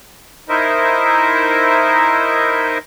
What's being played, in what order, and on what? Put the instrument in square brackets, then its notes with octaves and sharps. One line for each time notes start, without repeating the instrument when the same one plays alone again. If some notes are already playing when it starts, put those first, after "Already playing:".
[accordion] D#4 E4 A#4 C5 D#5 E5